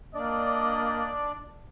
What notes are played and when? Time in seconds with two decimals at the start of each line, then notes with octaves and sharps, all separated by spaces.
0.15 A#3 D4 D5 D#5